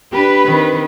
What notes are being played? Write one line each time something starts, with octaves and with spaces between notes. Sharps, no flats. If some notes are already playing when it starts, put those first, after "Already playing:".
D4 G4 B4
D#3 C4